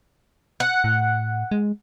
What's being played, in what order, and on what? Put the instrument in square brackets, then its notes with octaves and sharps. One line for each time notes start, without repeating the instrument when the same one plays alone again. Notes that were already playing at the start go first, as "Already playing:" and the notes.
[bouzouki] F#5
[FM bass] A2
G#3